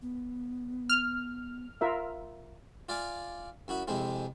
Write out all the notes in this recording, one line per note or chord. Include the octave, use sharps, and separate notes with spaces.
B3
F6
F4 A#4 E5
F4 D5 E5 F5 G#5 D6
F#2 E4 F#4 E5
F2 C3 G#3 C4 E4